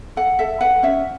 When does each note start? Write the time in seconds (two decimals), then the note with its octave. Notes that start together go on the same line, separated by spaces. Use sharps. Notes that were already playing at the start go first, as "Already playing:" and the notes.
0.17 A4 F#5
0.39 A4 E5
0.61 B4 F#5
0.83 C#4 E5